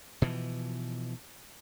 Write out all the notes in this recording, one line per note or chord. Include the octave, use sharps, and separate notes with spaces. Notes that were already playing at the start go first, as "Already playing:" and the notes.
B2 E3 F3